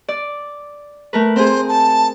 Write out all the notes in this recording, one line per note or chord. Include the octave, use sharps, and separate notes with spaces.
D5
A3 A#4 B4
C4 G#4 C5
A5